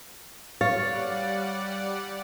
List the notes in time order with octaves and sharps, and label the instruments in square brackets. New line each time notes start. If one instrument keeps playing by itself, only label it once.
[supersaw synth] G3 D5 F#5 [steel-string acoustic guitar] C#5 [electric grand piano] F5 A6